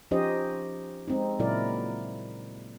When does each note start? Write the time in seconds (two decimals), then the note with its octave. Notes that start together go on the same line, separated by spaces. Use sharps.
0.11 F3 C#4 D#4 G4 C5 D#5
1.08 G#3 C4 D#4
1.39 A#2 C#3 F#3 E4 A#4 D5